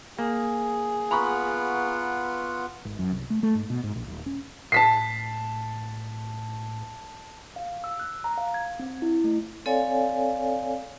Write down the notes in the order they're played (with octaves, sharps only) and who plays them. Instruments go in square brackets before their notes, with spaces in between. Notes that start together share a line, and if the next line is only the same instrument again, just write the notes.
[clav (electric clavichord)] A#3 [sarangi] G#4
[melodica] B3 F4 F#5 [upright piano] A#5 B5 C#6
[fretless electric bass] G#1
F#2
C2
A3
A3
G#2
B2
G#2
A#1
D#1
C#4
[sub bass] A2 [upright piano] A5 B6 C7
[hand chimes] F5
E6
F#6
A#5
F5
G#6
C4
E4
A3
[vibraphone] C4 A4 C#5 D5 F5 G#5